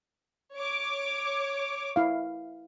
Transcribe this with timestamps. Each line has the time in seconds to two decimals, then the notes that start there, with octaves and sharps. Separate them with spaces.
0.56 C#5 D6
1.96 E4 F5